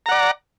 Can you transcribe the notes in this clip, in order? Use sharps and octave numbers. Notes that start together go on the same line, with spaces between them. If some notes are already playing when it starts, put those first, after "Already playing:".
D5 F#5 A#5